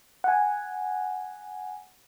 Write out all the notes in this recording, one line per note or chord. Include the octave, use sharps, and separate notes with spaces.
F#5 G#5